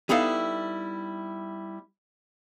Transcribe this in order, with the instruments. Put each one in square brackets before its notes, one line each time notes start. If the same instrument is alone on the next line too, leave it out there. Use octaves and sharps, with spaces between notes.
[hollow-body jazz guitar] G3 B3 D#4 E4 A4 F5